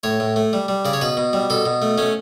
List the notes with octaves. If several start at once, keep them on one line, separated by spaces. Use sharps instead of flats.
A2 C#5
A2
A3
G3
G3
C#3 D5
C#5
B2 B4
B2
G3
B2 A4
B2
A3
A3 C#4